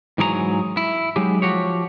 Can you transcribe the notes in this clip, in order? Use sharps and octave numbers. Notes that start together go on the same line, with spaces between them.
G#2 E3 F#3 G#4 A4 A#5
E4
F#3 G#3 D#4 G4
F3 F#4 G4 C#5